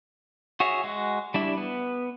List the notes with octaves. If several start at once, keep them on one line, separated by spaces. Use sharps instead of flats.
F#4 G#4 C#5 E5
G#3 F#4
G3 D4 E4
B3